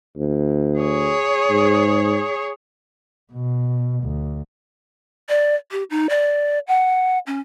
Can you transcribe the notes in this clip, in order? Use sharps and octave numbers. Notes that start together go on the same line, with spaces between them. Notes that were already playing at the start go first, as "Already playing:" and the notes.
D2
G#4 C#5
G#2
B2
D2
D5
G4
D#4
D5
F#5
C#4